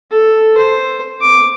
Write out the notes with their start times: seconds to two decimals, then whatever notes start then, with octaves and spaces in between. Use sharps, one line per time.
0.11 A4
0.57 C5
1.21 D6